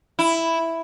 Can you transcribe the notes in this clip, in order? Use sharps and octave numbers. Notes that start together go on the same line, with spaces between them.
E4